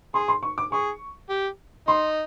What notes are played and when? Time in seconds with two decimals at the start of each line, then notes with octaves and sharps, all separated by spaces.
0.14 G#4 C6
0.28 C6
0.43 C#6
0.58 D6
0.72 G#4 C#6
1.29 G4
1.87 D#4 C6